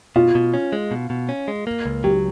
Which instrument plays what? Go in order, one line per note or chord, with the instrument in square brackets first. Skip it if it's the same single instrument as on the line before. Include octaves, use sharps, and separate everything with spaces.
[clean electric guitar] B2 [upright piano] F4
[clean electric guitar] B2
C#4
G#3
B2
B2
C#4
G#3
A#3
C#2
[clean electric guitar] F#3 [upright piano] G4